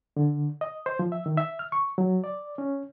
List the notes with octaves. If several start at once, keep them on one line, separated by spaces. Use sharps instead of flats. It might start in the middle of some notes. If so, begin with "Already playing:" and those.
D3
D#5
C5
F3
E5
D#3
E5
F6
C#6
F#3
D5
C#4